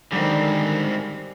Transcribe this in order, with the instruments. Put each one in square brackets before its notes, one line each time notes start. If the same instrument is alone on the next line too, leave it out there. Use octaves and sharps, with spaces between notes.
[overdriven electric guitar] G#2 C4 [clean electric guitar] D3 D#3 [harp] G3